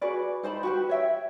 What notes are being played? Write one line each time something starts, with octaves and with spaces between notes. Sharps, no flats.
F#4 G#4 B4 D5
D#4 C5 A5 B5
F#4 G4 B4
C#5 E5 G5